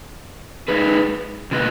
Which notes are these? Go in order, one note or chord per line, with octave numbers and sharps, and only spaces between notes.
G#3 D#4 G#4 B4
B2 A#3 F4 B4 D#5